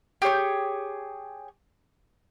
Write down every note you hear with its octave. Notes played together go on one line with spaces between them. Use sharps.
G4 G#4 C#5 G6